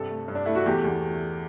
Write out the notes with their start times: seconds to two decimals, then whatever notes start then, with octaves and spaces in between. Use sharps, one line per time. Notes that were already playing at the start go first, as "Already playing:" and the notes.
Already playing: G2 C3 A4
0.10 A3
0.28 G2
0.35 D4
0.45 A3 E4
0.55 F#4
0.66 E2 G4
0.84 E2